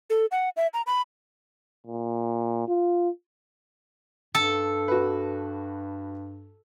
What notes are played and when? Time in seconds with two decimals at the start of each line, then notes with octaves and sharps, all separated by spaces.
0.10 A4
0.31 F#5
0.57 E5
0.74 A#5
0.87 B5
1.87 A#2
2.68 F4
4.35 G2 A4
4.88 F#4 B4